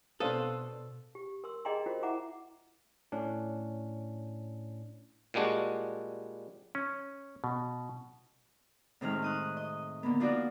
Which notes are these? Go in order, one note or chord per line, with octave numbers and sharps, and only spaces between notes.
B2 C4 D4 A4 B4 C5 F5 D#6
G4
A#4 C6 E6
G#4 D5 D#5 G5 A#5 C6
F4 F#4 A#4 C5
E4 E5 F#5 A#5 D6
A2 C#4 D4
A#2 G3 G#3 D4 F#4
C#4
B2
A2 C3 D#3 G#3 F6
D#4 D#6 F#6
D#5
D3 A#3 B3
F3 D4 D#4 F4 F#4 D5